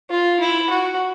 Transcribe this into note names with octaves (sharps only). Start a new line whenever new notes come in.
F4
E4
F#4